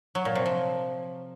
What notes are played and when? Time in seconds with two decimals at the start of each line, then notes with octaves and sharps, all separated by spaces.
0.15 F#3
0.25 A#2
0.35 C3
0.46 F3